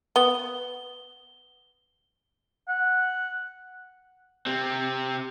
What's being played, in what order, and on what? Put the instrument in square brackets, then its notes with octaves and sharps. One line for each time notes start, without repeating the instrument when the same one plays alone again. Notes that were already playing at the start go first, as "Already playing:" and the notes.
[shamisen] B3 [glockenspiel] G7
[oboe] F#5
[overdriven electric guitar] C3 C4